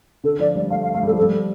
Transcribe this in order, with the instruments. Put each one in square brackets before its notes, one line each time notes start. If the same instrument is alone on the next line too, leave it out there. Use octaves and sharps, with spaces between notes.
[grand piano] D3 [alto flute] A4
[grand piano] F3 [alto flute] D5
[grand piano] G3 [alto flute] D5
[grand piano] A3 [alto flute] F5
[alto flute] F5
[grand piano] A3 [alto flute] F5
[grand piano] G3 [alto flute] A4
[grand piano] F3
[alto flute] A4
[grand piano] G3